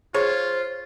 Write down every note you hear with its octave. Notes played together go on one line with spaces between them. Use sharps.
F4 G#4 C5 C#5